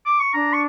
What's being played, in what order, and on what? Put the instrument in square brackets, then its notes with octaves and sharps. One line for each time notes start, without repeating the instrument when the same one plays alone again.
[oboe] D6
C#6
[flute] D4 [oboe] A#5
[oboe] C#6